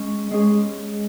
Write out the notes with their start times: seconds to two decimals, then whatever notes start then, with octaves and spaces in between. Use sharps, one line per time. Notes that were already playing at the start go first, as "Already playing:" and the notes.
Already playing: G#3 C#4
0.31 G#3 C#4 G#4